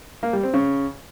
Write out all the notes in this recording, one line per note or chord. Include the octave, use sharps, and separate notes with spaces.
A#3
G3
C4
C#3